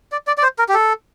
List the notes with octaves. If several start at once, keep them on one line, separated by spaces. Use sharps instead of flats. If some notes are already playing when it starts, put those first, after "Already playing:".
D5
D5
D5
C5
A#4
G4
A4